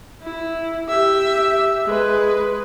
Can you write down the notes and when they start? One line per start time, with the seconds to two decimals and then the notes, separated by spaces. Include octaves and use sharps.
0.23 E4
0.89 G4 E5
1.86 G#3 B4